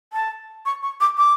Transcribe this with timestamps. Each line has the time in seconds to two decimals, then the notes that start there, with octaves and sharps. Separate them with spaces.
0.13 A5
0.66 C#6
0.83 C#6
1.01 D6
1.18 D6